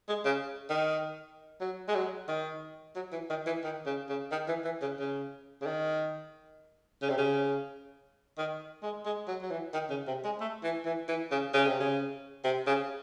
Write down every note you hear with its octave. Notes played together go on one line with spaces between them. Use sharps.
G#3
C#3
D#3
F#3
G#3
F#3
D#3
F#3
E3
D#3
E3
D#3
C#3
C#3
D#3
E3
E3
C#3
C#3
C#3
D#3
C#3
C3
C#3
D#3
G#3
G#3
F#3
F#3
E3
D#3
C#3
C3
G#3
A3
E3
E3
E3
C#3
C#3
C3
C#3
C3
C#3